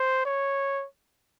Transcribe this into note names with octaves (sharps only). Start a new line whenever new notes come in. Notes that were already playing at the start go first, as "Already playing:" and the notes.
Already playing: C5
C#5